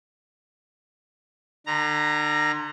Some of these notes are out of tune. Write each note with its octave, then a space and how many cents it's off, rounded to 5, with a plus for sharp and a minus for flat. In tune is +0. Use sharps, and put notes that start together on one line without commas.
D3 +40 A#5 +0